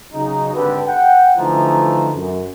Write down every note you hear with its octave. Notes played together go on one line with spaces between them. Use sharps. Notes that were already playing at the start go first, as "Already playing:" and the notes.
C#3 F#3 D#4
G#1 D3 G4 B4
F#5 G5
D3 E3 F3 A3 D#4 A#5
F#2